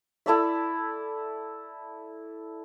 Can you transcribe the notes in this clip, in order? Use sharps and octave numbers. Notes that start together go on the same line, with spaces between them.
E4 A4 D5 E5